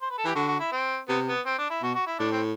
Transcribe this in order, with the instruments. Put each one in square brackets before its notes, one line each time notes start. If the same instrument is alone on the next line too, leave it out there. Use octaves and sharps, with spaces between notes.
[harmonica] C5
B4
A4
[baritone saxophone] E3 [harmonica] G4
[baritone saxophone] D3 [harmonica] F#4
[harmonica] F#4
E4
C4
[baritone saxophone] C3 [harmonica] B3
[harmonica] B3
C4
D4
E4
[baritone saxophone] B2 [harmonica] F#4
[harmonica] F#4
E4
[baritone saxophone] A2 [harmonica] D4
[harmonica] C4